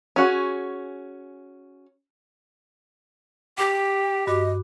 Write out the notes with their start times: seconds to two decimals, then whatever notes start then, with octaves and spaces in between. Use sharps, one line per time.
0.16 C#4 F#4 G#4
3.58 G4 G5 D6
4.27 G2 F#4 D#5 D6